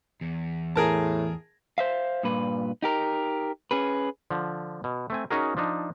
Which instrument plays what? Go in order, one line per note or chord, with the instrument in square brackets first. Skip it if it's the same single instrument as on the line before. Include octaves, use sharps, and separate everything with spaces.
[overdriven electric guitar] E2
[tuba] A2 [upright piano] G#4 A#4 A5
[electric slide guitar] C5 E5 F5
G2 A#2 B4
D#4 G4 A#4
C#4 G#4 B4
[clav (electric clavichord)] D3 F3
B2
A3 C4 G#5
C#4 D#4 F#4 G#4 A#4
F3 D4 D#4